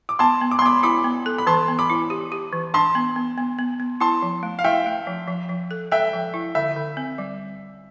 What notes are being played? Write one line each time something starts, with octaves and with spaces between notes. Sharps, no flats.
D6
B3 A5 C6
B3
D6
C6
B3 B5 D6
E4 B5 D6
B3
A4
B5
E3 A5 C6
B3
B5 D6
E4
G4
G4
E3
D4 A5 C6
B3
B3
B3
B3
B3
E4 A5 C6
F3
A3
F5
E4 E5 G5
A3
F3
F3
F3
A4
A4 E5 G5
F3
E4
D3 E5
D3
C4
G3